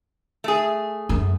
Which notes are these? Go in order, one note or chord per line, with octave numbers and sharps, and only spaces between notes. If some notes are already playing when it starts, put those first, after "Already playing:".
A3 G#4
F#2